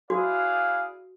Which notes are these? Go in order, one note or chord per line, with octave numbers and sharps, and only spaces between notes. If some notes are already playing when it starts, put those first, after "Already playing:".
E4 F#4 G#4 B4 D5 F5